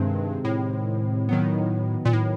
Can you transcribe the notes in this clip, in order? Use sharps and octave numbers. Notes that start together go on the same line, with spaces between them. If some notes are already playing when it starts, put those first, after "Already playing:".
Already playing: G2 C3 D#3 G#3 C4
A2
D#3 F#3 B3
A#2
A2